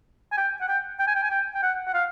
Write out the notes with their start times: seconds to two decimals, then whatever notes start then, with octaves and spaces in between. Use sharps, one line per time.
0.32 G#5
0.37 G5
0.61 F#5
0.68 G5
0.99 G5
1.08 G#5
1.15 G5
1.23 G#5
1.30 G5
1.54 G5
1.63 F#5
1.87 F#5
1.94 F5